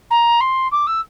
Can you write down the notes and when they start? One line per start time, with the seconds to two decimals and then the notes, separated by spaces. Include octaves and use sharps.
0.10 A#5
0.40 C6
0.71 D6
0.87 E6